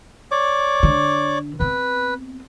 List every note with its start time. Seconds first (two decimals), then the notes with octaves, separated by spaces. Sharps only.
0.31 C#5 D5 D6
0.83 D3
1.60 B3 C4 B4